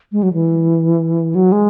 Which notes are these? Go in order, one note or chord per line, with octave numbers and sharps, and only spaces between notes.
G#3
F#3
E3
F#3
G#3